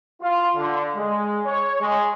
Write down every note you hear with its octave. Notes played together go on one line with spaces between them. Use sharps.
F4
D3
G#3
C#5
G#3